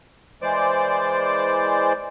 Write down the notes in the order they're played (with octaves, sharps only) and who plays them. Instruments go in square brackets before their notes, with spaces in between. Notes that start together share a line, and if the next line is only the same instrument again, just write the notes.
[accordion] E3 G#3 C5 D5 D6